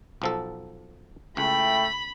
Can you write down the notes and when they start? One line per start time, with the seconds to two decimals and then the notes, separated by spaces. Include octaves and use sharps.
0.22 B1 F3 A4
1.37 C#2 A3 E4 G5 B5